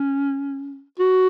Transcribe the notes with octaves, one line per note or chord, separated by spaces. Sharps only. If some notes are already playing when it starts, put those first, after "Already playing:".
Already playing: C#4
F#4